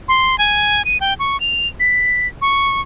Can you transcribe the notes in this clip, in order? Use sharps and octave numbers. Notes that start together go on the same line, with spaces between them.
C6
G#5
D#7
G5
C#6
F7
B6
C#6